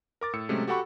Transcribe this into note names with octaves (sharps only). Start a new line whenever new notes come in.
A#4 D6 A6
A2 E6 C#7
C3 F#3 G#3 A3 C#4
F#4 G4 A4 F#5 B5 C#6